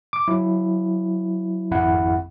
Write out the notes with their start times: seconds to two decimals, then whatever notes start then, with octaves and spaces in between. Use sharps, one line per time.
0.13 D6
0.28 F#3 E4
1.71 G#1 F2 E4 F#5